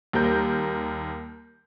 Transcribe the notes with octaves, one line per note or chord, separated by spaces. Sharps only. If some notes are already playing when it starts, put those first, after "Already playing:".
D#2 G3 A#4 G6